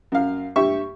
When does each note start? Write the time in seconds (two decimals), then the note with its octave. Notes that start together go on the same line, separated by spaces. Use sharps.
0.12 F#2 F5
0.56 G2 G4 E5 C#6